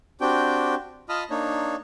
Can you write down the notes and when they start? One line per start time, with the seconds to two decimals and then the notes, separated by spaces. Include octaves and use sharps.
0.21 C4 D4 F#4 G4 G5
1.09 F4 D#5 A5 B5 D#6 F6
1.30 A#3 D4 D#4 C#5